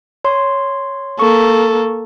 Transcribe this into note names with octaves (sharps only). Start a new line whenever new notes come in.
C#5 C6
A#3 A4 C#6